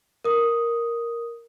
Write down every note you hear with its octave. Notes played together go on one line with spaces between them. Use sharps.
A#4 D#6